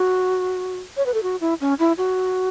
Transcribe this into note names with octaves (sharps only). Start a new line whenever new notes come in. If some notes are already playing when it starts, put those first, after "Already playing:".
Already playing: F#4
C#5
B4
A4
F#4
E4
C#4
E4
F#4